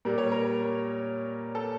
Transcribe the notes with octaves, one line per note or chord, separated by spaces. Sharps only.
A#2 G3 A#4
C#5
A#4
A4